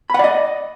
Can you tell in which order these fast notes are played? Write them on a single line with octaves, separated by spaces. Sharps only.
B5 F#5 D5 D#5